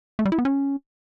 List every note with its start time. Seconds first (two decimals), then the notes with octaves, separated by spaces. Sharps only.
0.19 A3
0.25 G3
0.32 E4
0.39 B3
0.45 C#4